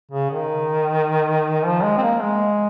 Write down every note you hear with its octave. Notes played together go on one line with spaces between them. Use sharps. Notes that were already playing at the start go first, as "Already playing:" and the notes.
C#3
D#3
F3
G#3
C4
A#3
G#3